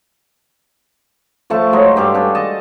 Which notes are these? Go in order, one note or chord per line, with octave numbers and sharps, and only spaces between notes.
F3 A3 A5 C#6
F#3 G#3
G2 G4 A4 F5
D4 G#4 A4
D#5 A5